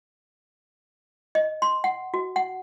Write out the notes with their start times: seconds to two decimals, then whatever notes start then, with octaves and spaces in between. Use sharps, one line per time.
1.35 D#5
1.62 C6
1.84 F#5
2.14 F#4
2.36 F#5